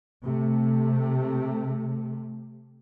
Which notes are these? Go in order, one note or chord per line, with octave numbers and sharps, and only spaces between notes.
C3 A3